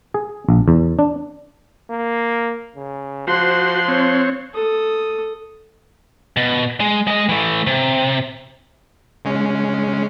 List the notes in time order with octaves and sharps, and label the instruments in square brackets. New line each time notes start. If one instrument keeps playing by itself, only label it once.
[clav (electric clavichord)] G#4
A#1
E2
D4
[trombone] A#3
C#3
[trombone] F3 [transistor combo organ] F#4 C5 [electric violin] C6 F#6
[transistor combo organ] C4 C#5
[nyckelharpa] A4 D#6
[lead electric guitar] B2
G#3
G#3 D#5
E3 A3
C3
[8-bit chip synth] C#3 G#3 C#4